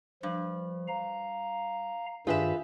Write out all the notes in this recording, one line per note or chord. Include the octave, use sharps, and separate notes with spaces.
G2 F3
F5 A#5
G2 D#3 D4 F4 G4 G#4 B4 E5